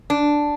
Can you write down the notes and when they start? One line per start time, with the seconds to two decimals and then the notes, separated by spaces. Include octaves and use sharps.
0.10 D4